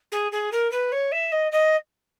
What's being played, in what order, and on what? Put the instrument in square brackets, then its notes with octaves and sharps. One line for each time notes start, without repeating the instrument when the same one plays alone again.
[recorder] G#4
G#4
A#4
B4
C#5
E5
D#5
D#5